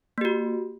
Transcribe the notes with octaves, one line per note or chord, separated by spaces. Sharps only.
A#3 F#4 G4